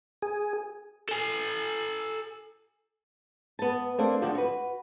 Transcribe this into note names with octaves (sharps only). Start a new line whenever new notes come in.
G#4
A4 G#5
B3 A5
A3 A#3 C4 D4
D3 F3 D4 F#4 G4
F#4 B4